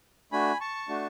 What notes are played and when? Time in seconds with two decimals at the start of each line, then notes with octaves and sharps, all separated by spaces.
0.32 A3 D4 F#4 G#5 B5
0.61 A5 C#6
0.89 A3 D4 F#4